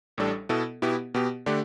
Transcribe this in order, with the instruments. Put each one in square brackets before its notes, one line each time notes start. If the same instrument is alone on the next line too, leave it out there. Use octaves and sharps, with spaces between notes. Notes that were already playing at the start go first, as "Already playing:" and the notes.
[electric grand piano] A1 A2 G3 D4 A4
B2 B3 E4 A4
B2 B3 E4 G4
B2 B3 G4
D3 A3 D4 G4